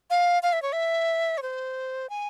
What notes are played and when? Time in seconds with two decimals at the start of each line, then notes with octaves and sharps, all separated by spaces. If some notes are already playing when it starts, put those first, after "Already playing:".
0.10 F5
0.43 F5
0.53 E5
0.62 C#5
0.73 E5
1.38 C#5
1.42 C5
2.10 G#5